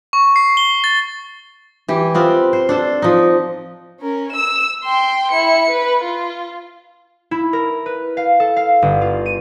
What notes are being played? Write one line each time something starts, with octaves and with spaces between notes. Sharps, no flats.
C#6
C7
G7
A6
E3 G4
B3 C4 F4
C5
D4 A4 C5
F3 D#4
C#4 A#4
E6 E7
G5 C6
E4 C#7
B4
F4
E4
A#4
B4
F5
A4
F5
G1
F4
D#7